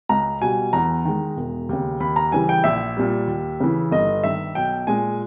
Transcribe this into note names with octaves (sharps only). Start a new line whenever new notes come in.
C#2 A#5
B2 G3 G#5
E2 A#5
D#3 G#3
E1
D#2 C#3
D#2 B5
A#5
C#3 E3 G3 G#5
G5
A#1 E5
A#2 G3
D#2
C#3 E3
G1 D#5
G2 D#3 G3 E5
B1 G5
A#2 G#3 G#5